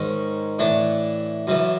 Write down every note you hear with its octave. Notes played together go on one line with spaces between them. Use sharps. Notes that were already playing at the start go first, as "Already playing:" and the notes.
Already playing: G#2 D#3 G#3 C#4
A2 E3 A3 D4
F#2 C#3 E3